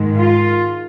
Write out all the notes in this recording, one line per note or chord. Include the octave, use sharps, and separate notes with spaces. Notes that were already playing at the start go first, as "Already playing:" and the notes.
Already playing: G#2 D#3 G#3
F4